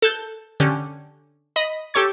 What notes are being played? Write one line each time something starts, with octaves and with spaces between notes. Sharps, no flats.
A4 A5 F#6 G6
D3 C#4 G4
D#5 B5
G4 A4 C#5 C#6 G#6